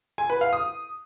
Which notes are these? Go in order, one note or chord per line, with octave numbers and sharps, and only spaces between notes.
G#5
B4
F5
D#6